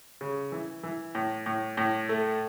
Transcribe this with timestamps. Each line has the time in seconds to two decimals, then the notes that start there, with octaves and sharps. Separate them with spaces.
0.21 C#3
0.52 E3
0.83 E3
1.15 A2
1.46 A2
1.77 A2
2.09 A3